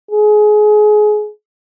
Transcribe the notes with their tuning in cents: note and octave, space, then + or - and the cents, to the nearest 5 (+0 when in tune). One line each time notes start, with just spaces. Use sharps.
G#4 +25